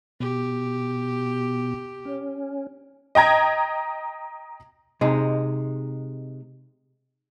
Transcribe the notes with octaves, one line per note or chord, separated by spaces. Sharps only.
B2 G4
C#4
D#5 G5 A#5 G#6
C3 G#3 D#4